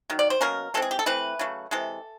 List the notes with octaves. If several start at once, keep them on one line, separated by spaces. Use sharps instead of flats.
D#3 F#3
D5
C5
B2 F#3 A#3 C#4 A#4
E3 G#3 C4 A4
G#4
G4
A4
E3 A3 C4 B4
C#3 F#3 A3
C3 E3 G#3 A4